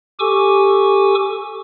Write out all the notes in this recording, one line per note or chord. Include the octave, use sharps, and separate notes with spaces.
G4 A4 G#5 C#6 D6 E6